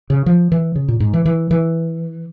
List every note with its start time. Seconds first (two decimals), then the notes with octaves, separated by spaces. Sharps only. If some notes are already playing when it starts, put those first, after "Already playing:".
0.10 C#3
0.26 F3
0.52 E3
0.75 C#3
0.88 A#2
1.00 G#2
1.13 E3
1.25 E3
1.51 E3